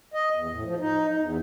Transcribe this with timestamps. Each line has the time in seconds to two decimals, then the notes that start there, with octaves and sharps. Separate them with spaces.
0.14 D#5
0.36 E2
0.53 A2
0.65 F3
0.80 D#4
1.08 D#4
1.20 E2